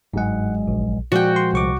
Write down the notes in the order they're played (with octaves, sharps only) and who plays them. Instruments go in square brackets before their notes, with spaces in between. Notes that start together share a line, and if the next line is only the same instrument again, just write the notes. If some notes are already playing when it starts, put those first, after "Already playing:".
[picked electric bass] G1 F#3 G#3 [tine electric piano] G#2 F#5
[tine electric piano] A#1
[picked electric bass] A#2 F3 G#3 [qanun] F#4 G5 [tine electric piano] D5
[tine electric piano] C6
C2 C#6 D6